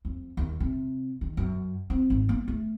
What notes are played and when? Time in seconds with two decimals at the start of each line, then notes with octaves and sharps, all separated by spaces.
0.05 F2
0.37 D#2
0.60 C3
1.21 D#3
1.37 F#2
1.90 C4
2.10 G#1
2.29 A#3
2.48 A3